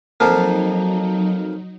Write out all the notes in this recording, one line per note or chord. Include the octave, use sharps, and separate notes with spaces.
F2 F3 F#3 A#3 D#4